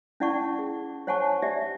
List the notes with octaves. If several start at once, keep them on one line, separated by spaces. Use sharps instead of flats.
C#4 E4 D5 F#5 A5 C#6
G#4
C5 C#5 F#5 G#5 A5 C#6
G4 D5 E5